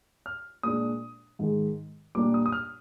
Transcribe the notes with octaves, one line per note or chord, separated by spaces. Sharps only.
F6
A#2 G#3 D4 D#6
G#2 D#3 G#3
A#2 G3 A#3 D4 D6
D#6
D#6
F6